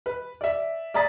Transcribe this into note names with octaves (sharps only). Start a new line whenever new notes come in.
B4
D5 E5
D5 E5 A#5 D#6 A6 B6